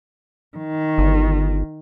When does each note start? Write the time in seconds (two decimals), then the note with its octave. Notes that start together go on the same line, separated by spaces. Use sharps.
0.58 D#3
0.98 G1